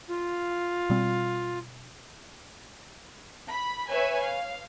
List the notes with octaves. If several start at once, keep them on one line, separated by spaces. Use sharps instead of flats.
F4
B2 G3 C4
B5
B4 C#5 E5 G#5
F5